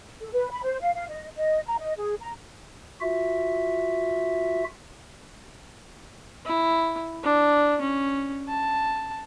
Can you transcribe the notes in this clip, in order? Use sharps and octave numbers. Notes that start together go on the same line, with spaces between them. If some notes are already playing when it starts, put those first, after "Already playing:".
A4
B4
B5
C5
F5
F5
D#5
D#5
A#5
D#5
G#4
A#5
F4 F#4 E5
E4
D4
C#4
A5